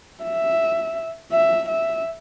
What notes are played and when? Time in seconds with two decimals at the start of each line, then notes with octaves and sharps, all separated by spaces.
0.24 E5
1.32 E5
1.68 E5